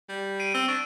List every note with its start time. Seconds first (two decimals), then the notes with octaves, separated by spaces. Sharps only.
0.09 G3
0.40 C7 D7 D#7
0.54 C4 E6
0.68 D4 C#6 D7